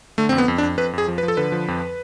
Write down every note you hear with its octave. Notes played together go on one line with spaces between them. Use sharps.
D3 A3
F2 C4
B3
F2
D4
F2
F2 B4
F2 G#4
F3
B4
F3
A4
D3 B4
F3
F2